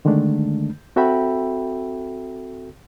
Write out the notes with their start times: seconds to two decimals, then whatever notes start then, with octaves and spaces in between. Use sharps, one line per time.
0.05 D3 D#3 G#3 A3 D4
0.96 C4 F#4 A4 E5 G5 B5